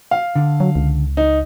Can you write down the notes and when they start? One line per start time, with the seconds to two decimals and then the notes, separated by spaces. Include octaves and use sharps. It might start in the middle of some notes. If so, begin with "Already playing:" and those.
0.11 F5
0.35 D3
0.60 F#3
0.76 C#2
1.17 D#4